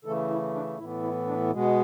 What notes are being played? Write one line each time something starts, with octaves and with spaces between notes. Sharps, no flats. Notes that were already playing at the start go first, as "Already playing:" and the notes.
C#3 E3 A3 A4
E4
D4
A2 E3 B3 E4
E4
D4
B2 G#3 B3